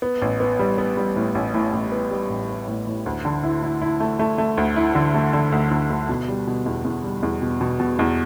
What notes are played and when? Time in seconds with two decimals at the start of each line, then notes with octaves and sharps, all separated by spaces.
0.02 B3
0.22 A1
0.40 B3
0.59 G3
0.78 B3
0.97 G3
1.16 A2
1.35 A1
1.54 A2
1.73 A1
1.92 B3
2.11 G3
2.30 A1
2.49 B3
2.68 A2
2.87 A2
3.06 D2
3.25 D3
3.44 E4
3.63 E4
3.82 E4
4.00 A3
4.19 A3
4.38 A3
4.57 D2
4.76 E4
4.95 D3
5.14 A3
5.33 D3
5.52 D2
5.71 D2
5.90 D2
6.09 B2
6.28 G3
6.47 B2
6.66 E2
6.85 E2
7.04 G3
7.23 E2
7.42 B2
7.61 B2
7.80 B2
7.99 E2